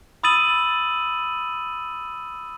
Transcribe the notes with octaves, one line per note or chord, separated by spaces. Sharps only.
B5 D#6 E6 A6 D#7 F#7